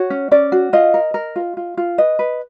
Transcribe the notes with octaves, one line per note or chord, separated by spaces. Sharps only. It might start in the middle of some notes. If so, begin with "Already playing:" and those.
Already playing: F#4 C#5
C#4
C#4 D5
F#4
F4 D#5
A#4
A#4
F4
F4
F4
B4 D#5
B4